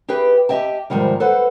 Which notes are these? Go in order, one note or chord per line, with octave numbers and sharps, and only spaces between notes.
G4 G#4 B4 E5 G5
G4 D#5 E5 G5 A5
G#2 C3 D#3 F3 G3
A4 B4 C5 F#5